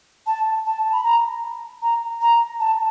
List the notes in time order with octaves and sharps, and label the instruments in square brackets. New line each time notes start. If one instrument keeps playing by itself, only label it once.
[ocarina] A5
A5
B5
A#5
A#5
A#5
A5